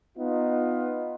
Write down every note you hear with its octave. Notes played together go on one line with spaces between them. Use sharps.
B3 D#4 F4